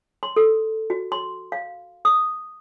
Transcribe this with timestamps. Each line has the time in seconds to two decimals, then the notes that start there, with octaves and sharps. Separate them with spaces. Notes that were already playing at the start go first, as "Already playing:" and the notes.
0.23 C6
0.36 A4
0.90 F#4
1.12 C6
1.52 F5
2.05 D#6